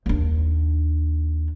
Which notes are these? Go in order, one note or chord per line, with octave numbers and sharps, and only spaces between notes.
D#2 D4